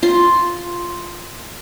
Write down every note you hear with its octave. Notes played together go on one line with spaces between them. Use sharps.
F4 C6